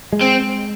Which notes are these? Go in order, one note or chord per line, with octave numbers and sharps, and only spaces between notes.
G#3
C4